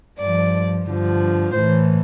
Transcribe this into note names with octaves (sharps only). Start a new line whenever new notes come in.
G2 F3 D5
G2 D3 F3
A2 E3 C5